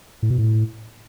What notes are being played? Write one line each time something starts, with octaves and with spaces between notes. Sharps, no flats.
A2
B2
A2